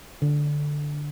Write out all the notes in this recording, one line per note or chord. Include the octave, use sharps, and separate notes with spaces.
D3